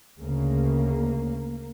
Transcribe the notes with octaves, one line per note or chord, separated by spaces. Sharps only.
D2 C#3 A#3